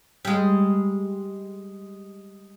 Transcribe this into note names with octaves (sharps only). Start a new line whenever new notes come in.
G3 G#3